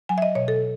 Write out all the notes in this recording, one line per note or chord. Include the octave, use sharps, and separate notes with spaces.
F#3 G#5
E5
D#5
B2 C#5
A4